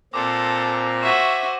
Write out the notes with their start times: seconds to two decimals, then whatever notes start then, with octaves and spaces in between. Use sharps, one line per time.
0.14 A#2 C4 A4 A#5 D6
1.03 F#4 C5 E5 C#6 G#6 D#7